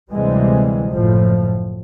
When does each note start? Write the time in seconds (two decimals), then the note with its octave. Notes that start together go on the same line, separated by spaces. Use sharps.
0.11 D2 C3 E3 G3 G#3
0.93 F#1 A2 F3